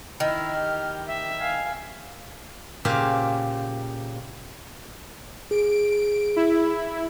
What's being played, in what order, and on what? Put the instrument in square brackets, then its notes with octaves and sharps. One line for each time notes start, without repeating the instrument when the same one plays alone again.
[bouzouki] D#3 [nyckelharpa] E4 [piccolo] F6
[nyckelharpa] G4
[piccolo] E5
[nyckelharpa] F5 G#5
[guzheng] A#2 C#3 G4 C5 F5 G#5
[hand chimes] G#4 [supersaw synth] D7
[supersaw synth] E4